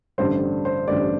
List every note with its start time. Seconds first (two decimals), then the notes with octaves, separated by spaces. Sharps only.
0.18 A1 G2 D3 G3 C5
0.65 C5
0.88 A1 G2 D3 G3 D5